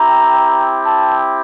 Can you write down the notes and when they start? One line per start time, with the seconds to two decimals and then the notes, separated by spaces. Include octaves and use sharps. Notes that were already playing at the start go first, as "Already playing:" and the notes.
Already playing: C4 E4 G4 A#5
0.86 A5